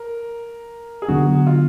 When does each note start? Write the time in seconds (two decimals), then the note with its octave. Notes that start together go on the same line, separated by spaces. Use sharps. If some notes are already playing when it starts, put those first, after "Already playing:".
Already playing: A#4
1.02 G#4
1.08 D3 F#3 B3 D4 F#4
1.47 F4